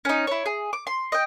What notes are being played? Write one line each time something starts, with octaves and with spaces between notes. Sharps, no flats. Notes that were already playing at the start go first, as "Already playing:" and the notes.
C#4 D#4
E4 C#5
G#4
D6
C6
D#5 G5